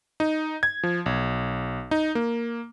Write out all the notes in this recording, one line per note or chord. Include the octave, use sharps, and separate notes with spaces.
D#4
G#6
F3
B1
D#4
A#3